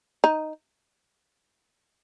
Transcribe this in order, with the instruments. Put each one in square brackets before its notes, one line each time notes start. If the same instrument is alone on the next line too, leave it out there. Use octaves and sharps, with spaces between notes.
[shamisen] D#4